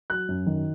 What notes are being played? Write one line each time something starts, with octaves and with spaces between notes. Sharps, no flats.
F#3 F#6
F#2
D#3